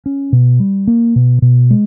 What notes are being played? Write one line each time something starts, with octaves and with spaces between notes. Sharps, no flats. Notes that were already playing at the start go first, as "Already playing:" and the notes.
C#4
B2
G3
A#3
B2
B2
G#3